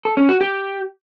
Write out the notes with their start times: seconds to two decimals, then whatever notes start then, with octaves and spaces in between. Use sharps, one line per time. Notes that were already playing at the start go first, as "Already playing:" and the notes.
0.05 A4
0.17 C#4
0.29 F#4
0.41 G4